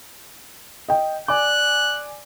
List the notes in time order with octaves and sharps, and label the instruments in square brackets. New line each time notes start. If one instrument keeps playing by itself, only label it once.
[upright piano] D#5 G5
[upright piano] D5 G#5 D6 [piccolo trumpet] F#6